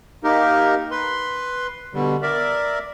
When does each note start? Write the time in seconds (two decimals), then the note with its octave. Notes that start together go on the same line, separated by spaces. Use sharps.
0.24 A#3 D#4 G4 A#4
0.91 B4 C6
1.94 B2 D3 G3
2.22 A#4 D5 E5